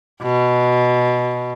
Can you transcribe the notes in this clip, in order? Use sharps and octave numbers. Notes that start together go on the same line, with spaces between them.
B2